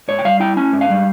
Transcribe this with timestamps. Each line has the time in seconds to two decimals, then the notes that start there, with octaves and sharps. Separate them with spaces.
0.08 G#2 C#5
0.19 G5
0.25 G3 F5
0.40 E4 G5
0.57 C#4 G#5
0.72 G#2
0.81 F5
0.89 G3